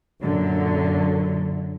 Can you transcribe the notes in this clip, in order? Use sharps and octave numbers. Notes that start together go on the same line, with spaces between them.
F#2 A#2 D3 F#3